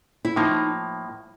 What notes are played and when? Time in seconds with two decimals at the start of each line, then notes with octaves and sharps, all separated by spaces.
0.25 E4
0.36 A2 F3 A#3 D#4